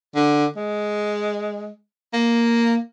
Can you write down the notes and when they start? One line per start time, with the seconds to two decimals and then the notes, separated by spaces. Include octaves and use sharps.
0.15 D3
0.57 G#3
2.13 A#3